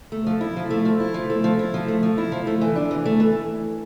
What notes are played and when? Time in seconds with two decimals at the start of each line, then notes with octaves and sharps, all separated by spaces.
0.12 A3
0.26 F3
0.41 E4
0.56 F3
0.70 A3
0.85 F3
1.00 E4
1.14 F3
1.30 A3
1.44 F3
1.59 E4
1.74 F3
1.88 A3
2.03 F3
2.18 E4
2.32 F3
2.47 A3
2.61 E3
2.76 D4
2.91 E3
3.05 A3
3.20 E3